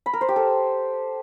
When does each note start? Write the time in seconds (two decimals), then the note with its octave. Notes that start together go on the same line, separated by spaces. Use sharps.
0.06 B5
0.13 A#4
0.21 C5
0.28 G4
0.36 A4